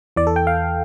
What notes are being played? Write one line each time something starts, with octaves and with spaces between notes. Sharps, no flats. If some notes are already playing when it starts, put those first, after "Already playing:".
E2 E3 D5
A4
G5
F5